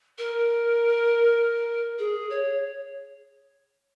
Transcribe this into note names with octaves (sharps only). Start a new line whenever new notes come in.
A#4
G#4
C#5